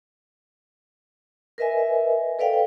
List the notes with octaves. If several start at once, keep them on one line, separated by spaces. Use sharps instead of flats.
A#4 B4 D#5 E5 G#5
A4 B4 D5 F5 G5